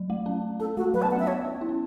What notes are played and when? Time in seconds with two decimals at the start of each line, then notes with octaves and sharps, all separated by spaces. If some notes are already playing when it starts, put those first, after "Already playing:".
Already playing: F#3
0.10 A3
0.26 C#4
0.60 C#4 A4
0.77 A3 F#4
0.94 F#3 B4
1.02 A5
1.05 B3
1.11 F#5
1.16 C#4
1.19 E5
1.27 B3 C#5
1.45 C#4
1.61 E4
1.69 C#4